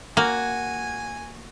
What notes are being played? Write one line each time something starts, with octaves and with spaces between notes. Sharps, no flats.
A#3 F#4 G#5